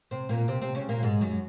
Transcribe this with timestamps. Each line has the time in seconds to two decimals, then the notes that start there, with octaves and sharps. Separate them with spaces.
0.11 C3 C4
0.29 A#2 A#3
0.48 C3 C4
0.62 C3 C4
0.75 C#3 C#4
0.89 A#2 A#3
1.03 G#2 G#3
1.21 F#2 F#3